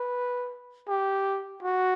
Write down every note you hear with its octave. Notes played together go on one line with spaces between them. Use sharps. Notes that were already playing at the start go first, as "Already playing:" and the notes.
Already playing: B4
G4
F#4